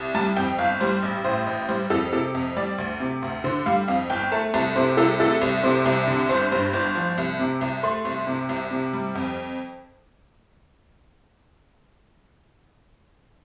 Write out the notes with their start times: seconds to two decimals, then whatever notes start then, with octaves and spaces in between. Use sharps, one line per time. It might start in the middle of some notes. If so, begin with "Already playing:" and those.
Already playing: C2
0.15 G3 A5
0.37 F2 G5
0.58 G1 F5
0.81 G3 C5
1.03 A1
1.24 A2 C5
1.47 A1
1.68 G3 C5
1.90 F2 A4
2.12 C3 A4
2.35 F2
2.56 G3 D5
2.78 D2
3.00 C3
3.22 D2
3.44 D3 C5
3.66 G3 F5
3.88 F2 F5
4.10 G1 G5
4.32 A3 A5
4.54 C2 A5
4.76 C3 C5
4.97 C2 A4
5.20 A3 A4
5.42 C2
5.63 C3 C5
5.86 C2
6.08 D3
6.29 G1 C5
6.52 G2 C5
6.73 G1 C5
6.95 F3
7.18 C2
7.39 C3
7.61 C2
7.83 A3 C6
8.05 C2
8.27 C3
8.49 C2
8.71 C3
8.93 G3
9.15 F2